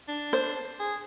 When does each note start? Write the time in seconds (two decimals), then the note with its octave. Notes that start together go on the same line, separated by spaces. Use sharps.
0.08 D4
0.33 C5
0.80 G#4